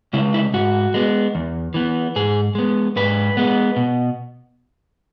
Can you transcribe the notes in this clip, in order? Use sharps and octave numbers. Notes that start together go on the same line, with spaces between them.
C#3 G#3 E4
E4
G#2 F#4
G#3 B3
E2
E3 B3
G#2 G#4
G#3 B3
G#2 B4
G#3 B3
B2